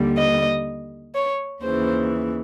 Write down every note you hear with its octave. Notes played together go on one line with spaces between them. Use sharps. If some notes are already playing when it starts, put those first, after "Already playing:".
Already playing: D#2 D3 G3
D#5
C#5
D#2 C#3 E3 C5